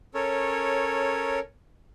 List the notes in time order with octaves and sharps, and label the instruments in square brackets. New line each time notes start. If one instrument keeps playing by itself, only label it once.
[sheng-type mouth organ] C#4 A4 A#4 C#5